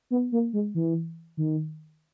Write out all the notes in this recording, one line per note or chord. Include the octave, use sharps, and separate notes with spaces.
B3
A#3
G#3
E3
D#3